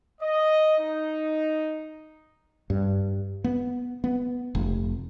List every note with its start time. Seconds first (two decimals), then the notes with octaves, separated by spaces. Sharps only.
0.21 D#5
0.79 D#4
2.70 G2
3.44 B3
4.04 B3
4.55 F1